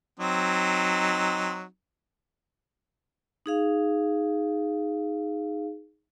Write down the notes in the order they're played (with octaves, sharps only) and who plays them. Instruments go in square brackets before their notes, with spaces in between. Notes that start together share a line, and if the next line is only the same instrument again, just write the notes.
[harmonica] F#3 C4 D#4
[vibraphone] D#4 G#4 F5